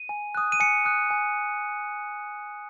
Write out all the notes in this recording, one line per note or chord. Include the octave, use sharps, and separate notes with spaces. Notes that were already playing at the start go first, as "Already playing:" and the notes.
Already playing: D#7
G#5
D#6 F#6
D#7
G#5 C#7
D#6 F#6
G#5